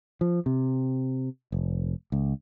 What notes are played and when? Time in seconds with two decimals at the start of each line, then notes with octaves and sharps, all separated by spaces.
0.21 F3
0.46 C3
1.52 F1
2.12 C#2